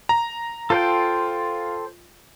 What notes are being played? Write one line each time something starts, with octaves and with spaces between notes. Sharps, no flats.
A#5
F4 A4 C5 G5